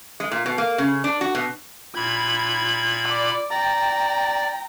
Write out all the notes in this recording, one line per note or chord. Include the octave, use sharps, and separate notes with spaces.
G#3
A#2
B2
A#3
C#3
D4
F#4
B2
A#2 B5 G#6
D5
D5 G5 A#5